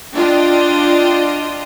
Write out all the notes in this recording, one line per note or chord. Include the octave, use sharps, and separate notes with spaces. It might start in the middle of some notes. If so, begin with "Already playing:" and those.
D4 F4 D#5 G5